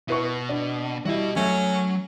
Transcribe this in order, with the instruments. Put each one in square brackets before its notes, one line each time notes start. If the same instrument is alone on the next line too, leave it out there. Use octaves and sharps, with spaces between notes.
[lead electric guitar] B2 [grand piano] E4 B4 C#6
[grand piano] D4
[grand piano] G3 E4 [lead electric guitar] F#4 D#5
[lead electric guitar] F#3 [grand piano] A3 [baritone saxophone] C#4